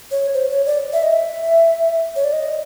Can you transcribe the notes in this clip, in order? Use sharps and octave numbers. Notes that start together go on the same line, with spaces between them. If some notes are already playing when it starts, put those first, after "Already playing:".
C#5
C5
C#5
D5
E5
D#5
E5
C#5
D5
D#5